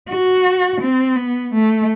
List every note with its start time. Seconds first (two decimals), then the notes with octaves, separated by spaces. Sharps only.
0.09 F#4
0.81 C4
1.16 B3
1.53 A3